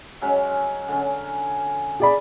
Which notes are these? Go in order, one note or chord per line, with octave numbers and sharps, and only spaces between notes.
F#3 G#3 C#4
D3 C#4
G#4 D5 B5